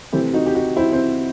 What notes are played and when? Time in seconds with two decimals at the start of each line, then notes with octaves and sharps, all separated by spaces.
0.13 C3 E3 A3 C4 E4 G4
0.33 D#4 F#4
0.46 G4
0.55 D#4 F#4
0.77 C4 E4
0.93 C4